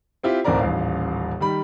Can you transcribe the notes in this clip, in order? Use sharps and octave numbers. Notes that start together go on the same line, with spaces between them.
C4 E4 F4 G4
D1 B1 C4 A#4 D5 A#5
D#1 A1 F5
D#3 G3 B5